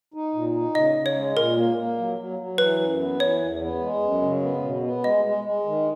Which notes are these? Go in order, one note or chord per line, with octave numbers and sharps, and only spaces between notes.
D#4
A#2
D#4
C#3 D#5
C#3
C#5
G#3
A#2 A#4
A#3
A#3
F#3
F#3
F#3
E3 B4
F#2
B3
E3 C#5
E2
B3
G#3
F#2
C#3
B3
B2
B3
G#3 D#5
G#3
G#3
D#3